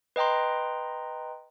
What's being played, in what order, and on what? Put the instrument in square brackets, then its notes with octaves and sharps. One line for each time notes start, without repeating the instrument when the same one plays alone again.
[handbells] B4 D#5 G5 A#5 C6